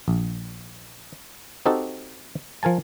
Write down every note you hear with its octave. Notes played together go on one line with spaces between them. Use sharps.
A#1
C4 D#4 F#4 G4 A4
F3 A#4 G#5 A5